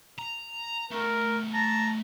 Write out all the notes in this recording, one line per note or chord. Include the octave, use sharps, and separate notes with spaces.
A#5
A3 B3 A#4
A5 A#5